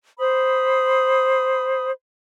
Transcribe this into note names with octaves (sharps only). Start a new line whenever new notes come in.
C5 B5 D#6